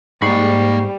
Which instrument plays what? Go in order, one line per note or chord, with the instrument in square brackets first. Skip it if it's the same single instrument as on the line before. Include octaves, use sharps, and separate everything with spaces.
[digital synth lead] G#2 [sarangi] G3 [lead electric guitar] A#3 B5 [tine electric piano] C#6 C7